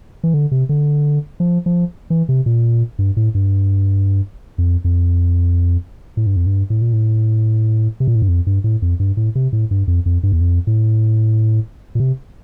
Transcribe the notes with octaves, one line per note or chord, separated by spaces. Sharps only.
E3
D3
C3
D3
F3
F3
E3
C3
A#2
G2
A2
G2
F2
F2
A2
G2
F2
G2
A2
A#2
A2
C3
A#2
A2
G2
F2
G2
A2
F2
G2
A2
C3
A2
G2
F2
F2
G2
E2
F2
A2
A#2
C3